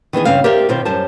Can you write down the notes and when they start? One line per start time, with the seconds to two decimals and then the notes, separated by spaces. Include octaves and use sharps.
0.13 D#3 E3 B3 G#4
0.25 G2 C#3 B3 C4 F5
0.44 G4 A#4 C5 D5 E5 F5
0.69 B2 D#3 C4 C5
0.85 F#2 G3 C5 A5